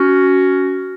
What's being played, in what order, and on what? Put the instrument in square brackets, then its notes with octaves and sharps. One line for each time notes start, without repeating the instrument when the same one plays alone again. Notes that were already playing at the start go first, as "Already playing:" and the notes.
Already playing: [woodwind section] C#4 F#4